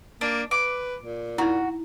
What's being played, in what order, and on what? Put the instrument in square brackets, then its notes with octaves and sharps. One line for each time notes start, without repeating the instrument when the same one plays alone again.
[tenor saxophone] A#3 [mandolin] D4
[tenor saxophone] B4 [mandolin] D6
[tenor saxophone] A#2
[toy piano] D#4 E4 [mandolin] F#4